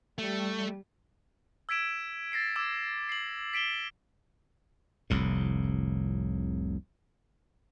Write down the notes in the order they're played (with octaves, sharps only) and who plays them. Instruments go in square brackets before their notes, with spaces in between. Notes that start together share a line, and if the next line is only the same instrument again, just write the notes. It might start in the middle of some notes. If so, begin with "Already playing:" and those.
[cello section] G3 [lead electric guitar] A3
[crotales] E6 G#6 B6 D7 E7
A6 A#6 C7 D7
D6 E6 G#6 E7
C7 F#7
B6 D7 E7 G7
[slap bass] F1 C2 A2